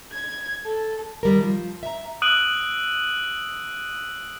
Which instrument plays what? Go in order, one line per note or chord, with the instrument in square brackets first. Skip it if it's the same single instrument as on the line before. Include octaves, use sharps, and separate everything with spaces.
[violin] G#6
A4
[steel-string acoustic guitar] D#3 G3 A#4
F3
E5 A#5
[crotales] D#6 E6 F#6 D7 D#7 F#7